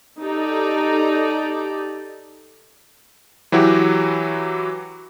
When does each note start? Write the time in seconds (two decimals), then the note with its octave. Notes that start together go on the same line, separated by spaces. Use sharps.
0.18 D#4 G4 A4 D5
3.52 E3 F#3 E4 F#4 G4